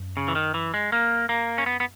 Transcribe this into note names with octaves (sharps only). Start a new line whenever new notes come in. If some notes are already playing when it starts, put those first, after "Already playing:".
Already playing: F#2
C#3
E3
D#3
E3
G#3
A#3
A#3
C#4
B3
B3